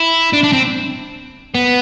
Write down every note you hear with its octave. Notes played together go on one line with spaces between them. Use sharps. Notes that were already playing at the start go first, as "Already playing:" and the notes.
Already playing: E4
D4
D4
C4
B3